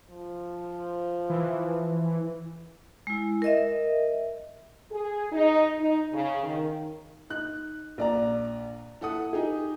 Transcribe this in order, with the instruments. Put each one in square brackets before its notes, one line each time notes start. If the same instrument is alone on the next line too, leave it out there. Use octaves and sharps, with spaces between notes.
[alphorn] F3
[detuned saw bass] E3
[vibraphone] G#3 E4
A#4 D#5 E5
[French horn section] G#4
D#4
D#4
C#3
D#3
[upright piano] D#4 F#6
A#1 D5 A#5
E4 A4 F#5 D#6
D#4 G4 G#4